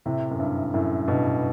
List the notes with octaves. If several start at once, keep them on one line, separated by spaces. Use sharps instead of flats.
A2 C3
F#2
G2
F#2 A2
G2 B2